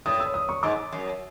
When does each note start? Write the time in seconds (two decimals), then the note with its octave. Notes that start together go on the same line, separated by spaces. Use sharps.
0.06 A2 D#6
0.20 E6
0.34 D#6
0.49 C#6
0.63 G#2 D6
0.92 F#2